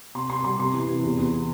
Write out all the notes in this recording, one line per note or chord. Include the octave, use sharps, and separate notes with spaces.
C3 C6
C3 C6
G3 C6
C3 C6
E3
C3
E2
E2